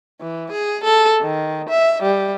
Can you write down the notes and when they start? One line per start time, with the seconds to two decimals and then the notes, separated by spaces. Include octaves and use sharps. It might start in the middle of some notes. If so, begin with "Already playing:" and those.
0.21 E3
0.52 G#4
0.84 A4
1.21 D#3
1.69 E5
2.03 G3